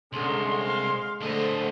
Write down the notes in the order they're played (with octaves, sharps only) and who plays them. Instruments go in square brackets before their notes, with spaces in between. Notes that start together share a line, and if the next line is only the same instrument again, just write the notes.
[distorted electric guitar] C2 [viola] D3 C#4 [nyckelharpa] G#3 [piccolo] C6
[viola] F5
[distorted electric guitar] D2 D#5 [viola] D3 C5 [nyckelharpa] A3